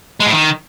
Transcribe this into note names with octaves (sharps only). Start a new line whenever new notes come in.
G#3
A2
D#3